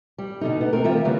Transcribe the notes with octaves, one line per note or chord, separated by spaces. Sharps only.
G3
B2 D3 D#4
B3
A3 C4 A#4
D#3 G3 F4 A#4 E5
C#3 E3 G3 A3 B3